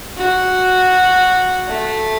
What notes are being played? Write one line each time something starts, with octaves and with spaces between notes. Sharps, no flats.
F#4
A3